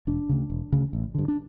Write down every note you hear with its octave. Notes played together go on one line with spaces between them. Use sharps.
E1 D4
D2 C#3
E1
D2 C#3
A1
G2 D3
D4